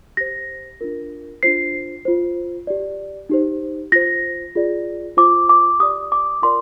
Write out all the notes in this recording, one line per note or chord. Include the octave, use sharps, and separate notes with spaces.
G4 C5 A#6
D4 F4 A#4
D4 F4 C5 C7
F4 C5
G4 D5
D#4 G4 C5
F4 C5 A#6
F4 G#4 D5
F4 C5 D6
D6
G4 D5 D#6
D6
F4 A#4 D5 C6